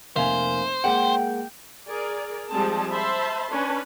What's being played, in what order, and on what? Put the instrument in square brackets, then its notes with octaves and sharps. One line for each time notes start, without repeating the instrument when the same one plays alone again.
[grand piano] F1 A#3 G#5 [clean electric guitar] A#4 E5 F5 [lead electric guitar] C5
[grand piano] G#3 A#3 [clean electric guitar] F#5 [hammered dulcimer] G5
[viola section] G#4 A#4 D5
F3 G3 G#3 C4 G#4 A5
C5 E5 A5 B5 C6
C#4 D4 B4